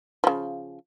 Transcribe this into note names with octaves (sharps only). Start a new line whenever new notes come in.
C#3 F3